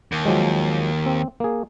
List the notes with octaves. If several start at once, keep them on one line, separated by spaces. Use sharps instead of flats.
D#2
F3 F#3 G#3
C4
A#3 G#4